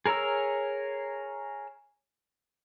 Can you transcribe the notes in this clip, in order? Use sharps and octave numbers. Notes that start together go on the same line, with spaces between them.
G#4 A#4 C#5 A#5 E6